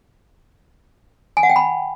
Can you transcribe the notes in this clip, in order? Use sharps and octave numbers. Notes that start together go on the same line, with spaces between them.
G#5
F#5
G5
B5